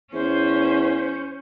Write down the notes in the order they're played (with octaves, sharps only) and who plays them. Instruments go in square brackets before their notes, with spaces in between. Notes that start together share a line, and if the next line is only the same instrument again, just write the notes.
[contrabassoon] E2 [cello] C#4 [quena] C5